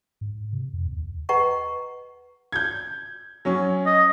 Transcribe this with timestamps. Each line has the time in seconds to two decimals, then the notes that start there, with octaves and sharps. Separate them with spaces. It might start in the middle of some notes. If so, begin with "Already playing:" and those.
0.21 G#2
0.53 C3
0.74 F2
0.88 D#2
1.29 B4 D#5 F#5 A#5 C#6
2.52 G6 G#6
3.45 F#3 C#4
3.86 D#5